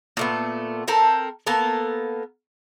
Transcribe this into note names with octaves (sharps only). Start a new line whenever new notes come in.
A#2 A3 B3
C4 A4 A#4
A#3 B3 A4 A#4